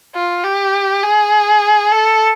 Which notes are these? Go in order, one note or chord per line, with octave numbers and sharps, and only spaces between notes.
F4
G4
G#4
A4